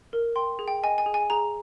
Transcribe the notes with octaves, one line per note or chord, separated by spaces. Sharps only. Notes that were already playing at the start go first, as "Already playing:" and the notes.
A#4
G5 C6
G#4
G5
D#5 G#5
G#5
G#4
G#5
G#4 A#5